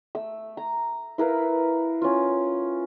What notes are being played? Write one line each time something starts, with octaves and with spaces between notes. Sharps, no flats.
A3 E6
A#5
E4 A#4 B4 F5
C#4 F4